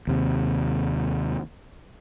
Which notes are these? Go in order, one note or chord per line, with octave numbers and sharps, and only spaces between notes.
D#2 C3